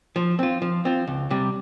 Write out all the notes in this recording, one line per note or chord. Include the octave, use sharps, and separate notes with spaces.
F3
C4 F4
F3
C4 F4
C#2
C3 G3